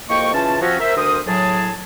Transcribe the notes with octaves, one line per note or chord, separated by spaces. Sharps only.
C2 F2 A#3 D#5 G5 C#6
C#3 E3 C#4 F4 A5
F3 C4 C#4 F#4
A#4 C5 E5
D2 A#4 C5 D#6
A2 F#3 G#4 A5